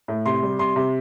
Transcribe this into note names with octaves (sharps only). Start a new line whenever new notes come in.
A2
C3 C6
G3
C3 C6
C3